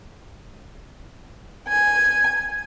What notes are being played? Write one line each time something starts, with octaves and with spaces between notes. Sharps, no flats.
G#5